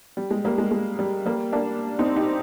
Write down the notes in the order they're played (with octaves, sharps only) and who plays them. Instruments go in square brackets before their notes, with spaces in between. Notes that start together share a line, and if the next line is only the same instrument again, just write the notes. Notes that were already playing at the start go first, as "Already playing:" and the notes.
[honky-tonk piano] G3
G#3
G3 A#3
G#3
G#3
G3
G3 A#3
A#3 D4
C4 D#4
D#4 G4